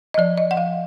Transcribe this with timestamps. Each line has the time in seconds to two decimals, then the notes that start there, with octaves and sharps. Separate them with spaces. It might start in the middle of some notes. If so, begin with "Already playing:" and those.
0.14 D#5
0.18 F3 D5
0.37 D#5
0.51 F#5
0.57 F3 F5